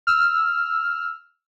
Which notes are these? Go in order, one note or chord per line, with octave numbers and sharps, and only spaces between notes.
E6 F6